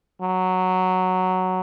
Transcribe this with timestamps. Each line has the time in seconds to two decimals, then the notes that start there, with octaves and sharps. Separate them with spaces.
0.21 F#3